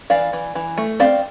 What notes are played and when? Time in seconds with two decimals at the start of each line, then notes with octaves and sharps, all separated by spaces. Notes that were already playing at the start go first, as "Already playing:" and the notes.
0.10 E3 D5 F5
0.33 E3
0.55 E3
0.77 A3
1.00 C4 D5 F5